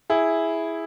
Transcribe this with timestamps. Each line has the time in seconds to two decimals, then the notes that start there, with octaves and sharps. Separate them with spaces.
0.10 E4 G#4